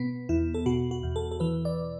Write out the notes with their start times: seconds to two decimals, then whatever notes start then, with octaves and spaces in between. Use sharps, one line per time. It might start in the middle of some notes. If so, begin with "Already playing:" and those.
Already playing: B2 B3
0.29 E2 E4
0.54 A4
0.66 B2 F#4
0.91 F#4
1.03 E2
1.16 A4
1.31 A4
1.40 E3 B4
1.65 D5